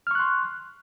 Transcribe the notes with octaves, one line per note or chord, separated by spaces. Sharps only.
C6 C#6 F6 F#6